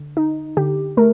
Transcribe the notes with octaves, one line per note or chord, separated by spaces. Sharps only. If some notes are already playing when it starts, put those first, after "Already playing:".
Already playing: D3
D#4
D3 G4
A3 A#4